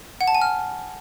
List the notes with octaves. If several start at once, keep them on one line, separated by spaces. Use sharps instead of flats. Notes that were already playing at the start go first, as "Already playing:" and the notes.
F#5
A5
G#5
F6